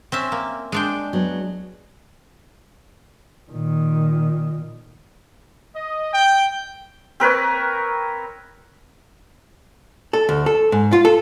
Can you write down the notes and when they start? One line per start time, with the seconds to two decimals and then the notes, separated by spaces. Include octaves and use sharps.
0.12 C4 C#4 E5
0.32 A#3
0.72 G#3 D4 G5
1.13 F#3 B3
3.51 A#2 D#3
5.75 D#5
6.13 G5
7.20 C4 A#4 B4 C#5
10.13 A4
10.29 D2
10.46 A4
10.72 G#2
10.92 F4
11.05 A4